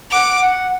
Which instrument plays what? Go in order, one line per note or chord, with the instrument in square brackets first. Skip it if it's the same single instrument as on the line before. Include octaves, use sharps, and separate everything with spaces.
[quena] F#5 [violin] D6
[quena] F#5